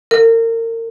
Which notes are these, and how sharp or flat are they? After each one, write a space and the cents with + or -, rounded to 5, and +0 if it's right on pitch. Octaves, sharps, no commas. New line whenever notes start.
A#4 -35